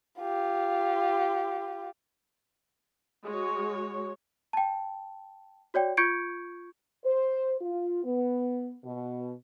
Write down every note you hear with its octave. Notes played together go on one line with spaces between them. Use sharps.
F4 G4
G#3 F#4 C#5
G5 A5
F#4 C#5 D5 G5
F4 C#6 G6 G#6 C#7 D7
C5
F4
B3
B2